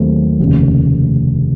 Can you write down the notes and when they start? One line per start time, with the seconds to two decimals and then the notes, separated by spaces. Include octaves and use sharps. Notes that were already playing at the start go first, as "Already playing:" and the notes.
Already playing: D#2 D#3 F#3 A3 C4
0.39 F1 D#2 C#3